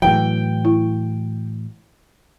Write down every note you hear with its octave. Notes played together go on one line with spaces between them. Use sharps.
A2 E3 F#3 G5
E4